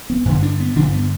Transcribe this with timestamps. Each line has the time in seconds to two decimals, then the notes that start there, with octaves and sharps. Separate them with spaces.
0.10 B3
0.25 G2 D3
0.42 D4
0.60 B3
0.76 G2 D3 D4
0.93 B3